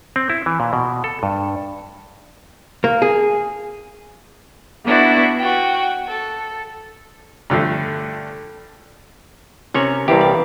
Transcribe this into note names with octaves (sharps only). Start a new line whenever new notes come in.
C4
E4
E3
A#2
B2
A4
G2
A#3
G#4
B3 D4 E4 F#4
F#4 G5
A4
G2 D3 F3 A3
C3 C#4 A#4 C#5 F#5 C#6
C2 E3 B3 C4 G4 F5
D5